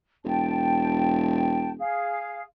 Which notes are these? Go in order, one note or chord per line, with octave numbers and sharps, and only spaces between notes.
E1 G5 A5
G#4 F5